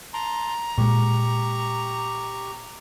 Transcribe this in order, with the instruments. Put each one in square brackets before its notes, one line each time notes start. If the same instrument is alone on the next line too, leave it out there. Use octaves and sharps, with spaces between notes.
[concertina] A5 C6 [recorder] A#5
[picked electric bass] A#2 G#3 [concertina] G4 C#6